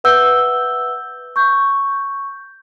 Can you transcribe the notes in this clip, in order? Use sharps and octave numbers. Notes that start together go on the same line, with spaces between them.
B4 E5 F#5 E6 G6 G7
C#6 G6